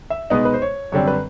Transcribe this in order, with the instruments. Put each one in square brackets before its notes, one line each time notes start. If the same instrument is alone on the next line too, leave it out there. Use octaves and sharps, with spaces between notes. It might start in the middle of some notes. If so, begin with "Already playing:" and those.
[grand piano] E5
B2 G#3 B3 D#4 D#5
B4
C5
C#5
F#2 D3 G3 C4 C#5
B4